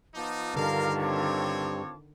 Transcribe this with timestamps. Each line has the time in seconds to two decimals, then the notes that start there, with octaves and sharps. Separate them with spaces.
0.14 F3 B3 D#4 F4 A5 D6
0.55 G2 D3 D#3 A#4 F5
1.00 C4 C#5